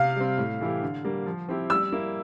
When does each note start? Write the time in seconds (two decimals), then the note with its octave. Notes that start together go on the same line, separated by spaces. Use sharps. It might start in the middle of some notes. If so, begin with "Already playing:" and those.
Already playing: C3 F5
0.16 G3 C4
0.38 A2
0.61 E3 A3 E4 G4
0.82 D3
1.05 G3 A#3
1.26 F3
1.49 C4 E4 G4
1.70 G3 E6
1.92 A#3 E4